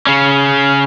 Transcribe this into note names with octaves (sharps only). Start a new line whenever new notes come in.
C#3 C#4